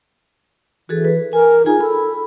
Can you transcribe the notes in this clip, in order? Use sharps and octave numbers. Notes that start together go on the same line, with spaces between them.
E3 F#4 G#4 A4
B4
A#4 G#5
D#4 F4 G#4 G#5
A4 B5